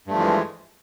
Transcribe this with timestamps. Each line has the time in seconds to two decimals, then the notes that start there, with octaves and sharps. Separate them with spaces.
0.07 G2
0.10 A3
0.14 F3
0.17 E3
0.21 G#3